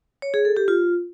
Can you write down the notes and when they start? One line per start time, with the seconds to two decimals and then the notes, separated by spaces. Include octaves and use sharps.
0.22 C#5
0.34 G#4
0.45 A4
0.57 G4
0.68 F4